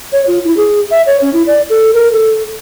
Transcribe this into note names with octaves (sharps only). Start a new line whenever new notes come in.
C#5
F4
E4
G#4
E5
C#5
C#4
E4
D5
A4
A#4
A4